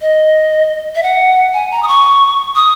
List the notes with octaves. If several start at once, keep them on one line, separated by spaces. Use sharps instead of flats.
D#5
E5
F#5
G#5
A#5
D#6
C#6
D#6